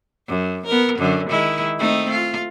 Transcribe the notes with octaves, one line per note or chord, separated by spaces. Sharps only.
F#2
B3 A#4
F#2 D3
D#3 G#3 E4
A3 C4 D#4
F4